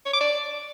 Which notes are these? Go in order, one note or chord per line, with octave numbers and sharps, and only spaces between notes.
C#5
D6
D5